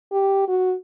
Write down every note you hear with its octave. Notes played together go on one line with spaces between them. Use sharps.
G4
F#4